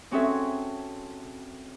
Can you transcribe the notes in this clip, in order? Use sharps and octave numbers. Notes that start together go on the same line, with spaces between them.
C4 C#4 F#4 G#4 A4 E5